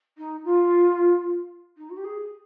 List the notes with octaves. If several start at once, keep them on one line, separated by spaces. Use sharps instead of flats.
D#4
F4
D#4
F#4
G4
G#4